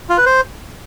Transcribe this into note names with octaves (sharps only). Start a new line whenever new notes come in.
F4
B4
C5